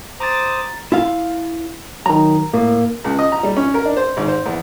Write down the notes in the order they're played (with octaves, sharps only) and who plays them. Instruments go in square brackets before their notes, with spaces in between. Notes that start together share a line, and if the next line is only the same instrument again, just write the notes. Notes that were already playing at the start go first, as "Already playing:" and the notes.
[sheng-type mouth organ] C5 D6 D#6 [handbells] A#5 A6
[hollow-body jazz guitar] E4 F4 F5
[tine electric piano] D#3 F#3 [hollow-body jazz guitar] A#5
[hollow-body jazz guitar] A2 [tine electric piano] A#3
[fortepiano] C#2
D#5
A#5
G3
C#4
A#4
D4
C5
G#1
C5
E2